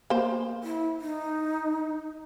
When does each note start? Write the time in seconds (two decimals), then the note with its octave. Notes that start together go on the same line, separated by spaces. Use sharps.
0.10 A#3 C5
0.64 E4
1.01 D#4